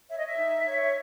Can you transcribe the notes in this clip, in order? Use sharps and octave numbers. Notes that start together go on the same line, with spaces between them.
C#5 E5
D#5
E5
D#4
C#5